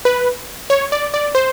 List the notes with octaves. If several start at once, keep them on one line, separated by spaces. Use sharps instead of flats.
B4
C#5
D5
D5
C5